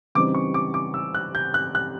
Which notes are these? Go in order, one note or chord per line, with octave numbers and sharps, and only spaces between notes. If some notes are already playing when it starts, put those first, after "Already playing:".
C#3 E3 G3 C4 D#4 D6
C#6
D6
D6
E6
F#6
G6
F#6
F#6